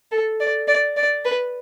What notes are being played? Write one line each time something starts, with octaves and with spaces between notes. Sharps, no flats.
A4
D5
D5
D5
B4